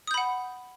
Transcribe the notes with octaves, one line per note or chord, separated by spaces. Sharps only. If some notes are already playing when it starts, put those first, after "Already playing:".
F#5 B5 D#6 G6